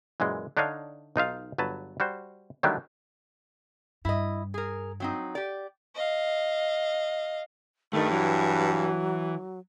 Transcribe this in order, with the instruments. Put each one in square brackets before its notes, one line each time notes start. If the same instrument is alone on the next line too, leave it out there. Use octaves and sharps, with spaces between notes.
[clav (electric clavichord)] F#2 A#2 E3 G#3
D3 D4 D#4 C#5 D#5 F5
B1 D#4 F4 F5
G1 F#3 B4 A5
G3 F#4 C5
D3 D#3 F#3 G3 A3 D4
[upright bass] G2 [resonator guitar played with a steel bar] E4 D#5
[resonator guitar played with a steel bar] G#4 A#4
F#3 C4 D#4
G4 D5
[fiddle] D#5 F5
[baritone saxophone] G2 [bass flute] D#3 [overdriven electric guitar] A3
[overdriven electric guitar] E3 [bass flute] F#3